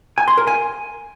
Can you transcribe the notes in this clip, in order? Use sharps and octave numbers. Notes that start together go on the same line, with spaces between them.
G#5
C6
A#4
G#5